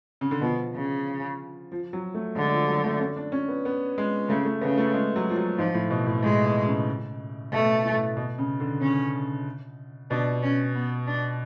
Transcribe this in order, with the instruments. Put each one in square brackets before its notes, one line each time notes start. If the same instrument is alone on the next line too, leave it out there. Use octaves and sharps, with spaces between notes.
[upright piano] C#3
D3
[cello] B2 [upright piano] F3
[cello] C#3
[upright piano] F3
F#3
A3
[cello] D3 [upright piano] G#3
[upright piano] F3
F#3
A3
C#4
D4
C#4
B3
B3
G#3
[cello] C#3 [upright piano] A3
[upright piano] A3
[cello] C#3 [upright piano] B3
[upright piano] A3
G#3
F#3
F3
F#3
[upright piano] G#2 [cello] F3
[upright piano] A2
B2
A2
[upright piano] A2 [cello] G#3
[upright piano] B2
C#3
[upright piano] B2 [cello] A3
[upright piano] A2
B2
C#3
D3
[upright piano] C#3 [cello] C#4
[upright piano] B2 [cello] D4
[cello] C#4
B3
D4